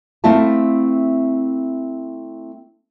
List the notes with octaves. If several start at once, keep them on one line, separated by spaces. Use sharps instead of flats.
A3 C4 E4 F4 E5 A5